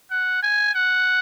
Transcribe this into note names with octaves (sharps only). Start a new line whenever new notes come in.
F#5
G#5
F#5